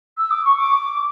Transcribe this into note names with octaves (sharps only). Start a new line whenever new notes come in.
E6
D6
C#6
D6